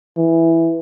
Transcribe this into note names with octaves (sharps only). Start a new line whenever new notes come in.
E3